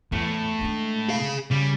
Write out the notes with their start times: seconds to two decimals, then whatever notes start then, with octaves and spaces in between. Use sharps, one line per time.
0.12 E2 A2
0.61 G#3 D4
1.09 G#4 F5
1.51 C#3 G3